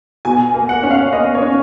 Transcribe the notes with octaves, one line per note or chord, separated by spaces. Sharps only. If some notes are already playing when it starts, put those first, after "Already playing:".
B2 G#5
A#3
F#5
C#4
F5
A#3 D#5
C#5
C#4